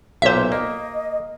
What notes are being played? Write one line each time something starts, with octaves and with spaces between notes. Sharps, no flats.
B1 A#2 C5 E5
A#3 D#5